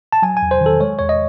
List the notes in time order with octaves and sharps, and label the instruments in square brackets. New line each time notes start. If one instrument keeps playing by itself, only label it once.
[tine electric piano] A5
F#3 G#5
G#5
E2
C5
D#3
A4
G#3 C#5
E2 C#5
D#5